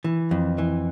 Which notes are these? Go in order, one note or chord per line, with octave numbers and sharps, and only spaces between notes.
E3
F2
E3